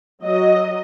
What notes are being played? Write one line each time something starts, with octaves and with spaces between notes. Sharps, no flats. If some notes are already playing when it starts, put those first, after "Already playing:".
F#3 D#5